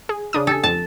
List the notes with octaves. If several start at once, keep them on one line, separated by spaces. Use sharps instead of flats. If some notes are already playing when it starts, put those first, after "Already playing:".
G#4
C#3 D4 D#6
G4 A4 G#5
F2 A5